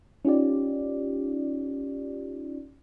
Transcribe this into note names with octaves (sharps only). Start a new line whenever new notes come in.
C#4 D#4 F4 G4 D5